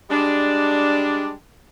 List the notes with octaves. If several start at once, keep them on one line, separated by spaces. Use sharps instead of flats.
G3 G#3 D4